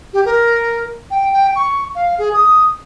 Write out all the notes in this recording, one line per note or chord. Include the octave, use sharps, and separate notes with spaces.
G4
A#4
G5
G5
C#6
F5
G#4
D#6